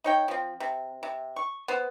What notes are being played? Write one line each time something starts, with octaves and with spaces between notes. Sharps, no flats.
D#4 C#5 G5
F3 C4
C3
C3
C#6
B3 C5